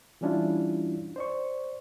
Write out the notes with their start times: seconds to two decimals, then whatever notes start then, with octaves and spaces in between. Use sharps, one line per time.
0.21 E3 G3 C#4 D4 E4 F4
1.16 C5 D5 C#6